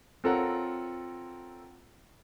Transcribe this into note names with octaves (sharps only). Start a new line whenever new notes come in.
C4 F4 A4 A#4 C#5 F#5